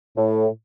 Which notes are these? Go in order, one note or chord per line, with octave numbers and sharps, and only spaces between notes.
A2